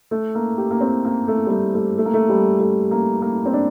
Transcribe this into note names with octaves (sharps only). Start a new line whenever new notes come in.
A3
A#3
G4
A#3
C4
A#3
A3
G3
A3
A3
A3
A#3
A3
G3
A3
A#3
A#3
C4
D4